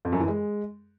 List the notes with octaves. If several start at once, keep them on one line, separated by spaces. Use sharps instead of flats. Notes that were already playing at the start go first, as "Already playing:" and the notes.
F2
F#2
E3
G#3